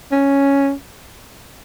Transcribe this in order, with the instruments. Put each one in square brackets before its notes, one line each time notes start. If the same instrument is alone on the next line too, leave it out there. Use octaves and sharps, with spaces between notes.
[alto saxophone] C#4